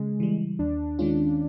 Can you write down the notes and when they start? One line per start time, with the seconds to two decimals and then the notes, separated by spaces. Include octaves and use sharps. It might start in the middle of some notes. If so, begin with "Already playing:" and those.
Already playing: C#3 G#3
0.20 E3 G3
0.59 D#2 D4
0.99 D#3 G#3 C#4 F4